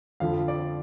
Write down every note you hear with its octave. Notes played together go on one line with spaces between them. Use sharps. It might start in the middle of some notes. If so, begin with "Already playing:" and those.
F2 D3 F3 F5
D5